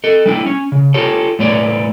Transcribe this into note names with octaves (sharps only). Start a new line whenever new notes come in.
A4 D#5
G3 D4 E4
C#4
C#3
F4 G4 A4 C#5
A2 A3 B3 C#5 D5